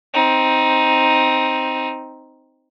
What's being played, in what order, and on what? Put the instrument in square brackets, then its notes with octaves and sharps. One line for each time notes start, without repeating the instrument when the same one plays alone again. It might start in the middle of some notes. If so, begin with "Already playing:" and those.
[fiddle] C4 D#4